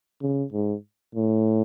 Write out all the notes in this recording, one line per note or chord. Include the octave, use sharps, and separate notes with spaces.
C#3
G#2
A2